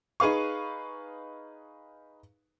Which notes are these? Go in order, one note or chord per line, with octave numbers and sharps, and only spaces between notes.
D#4 G#4 B4 F5 C#6